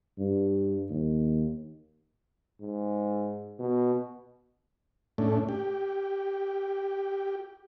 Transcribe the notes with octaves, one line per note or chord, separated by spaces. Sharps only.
G2
D#2
G#2
B2
A2 A3 C#4 D4
G4